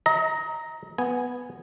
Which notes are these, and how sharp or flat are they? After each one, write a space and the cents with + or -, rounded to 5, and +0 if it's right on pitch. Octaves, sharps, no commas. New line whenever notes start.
D#5 +40 A#5 +0
B3 +0 G#5 +0